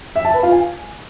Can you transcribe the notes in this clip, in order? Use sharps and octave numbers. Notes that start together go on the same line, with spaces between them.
E5
A5
B4
F4
G#5